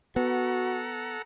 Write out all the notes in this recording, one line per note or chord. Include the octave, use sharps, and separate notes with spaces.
B3 F#4 A4 F#5 A#5